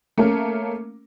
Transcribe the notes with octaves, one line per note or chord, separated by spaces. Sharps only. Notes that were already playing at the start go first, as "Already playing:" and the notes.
A3 A#3 C#4 A#4